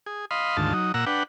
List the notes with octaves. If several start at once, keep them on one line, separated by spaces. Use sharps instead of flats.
G#4
D#5 F5 B5 C6
D2 G#2 D#3 F4 A5
F#3 D#4
A#2 F#5 A#5 E6
D4 B4 F#5 G5